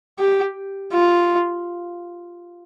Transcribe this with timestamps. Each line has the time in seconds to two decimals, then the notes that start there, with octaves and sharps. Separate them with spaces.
0.19 G4
0.93 F4